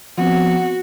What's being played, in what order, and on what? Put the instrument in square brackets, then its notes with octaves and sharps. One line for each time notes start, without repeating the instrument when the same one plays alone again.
[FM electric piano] F3 B3 C4 [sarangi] F#4